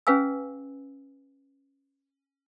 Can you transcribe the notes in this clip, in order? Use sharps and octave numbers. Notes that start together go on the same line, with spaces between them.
C#4 G#4 B4 F5 G#5 E6